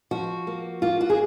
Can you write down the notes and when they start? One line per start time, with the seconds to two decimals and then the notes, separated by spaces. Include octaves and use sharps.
0.11 F3 F#4
0.47 A#3
0.82 A#3 F4
1.01 F#4
1.10 G#4